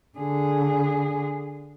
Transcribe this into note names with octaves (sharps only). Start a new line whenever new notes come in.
D3 G#4